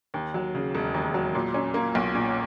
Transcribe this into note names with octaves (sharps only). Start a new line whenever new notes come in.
D#2
F#3
C#3
E1
D#2
F#3
A#2
C#4
A#3
B1
A#2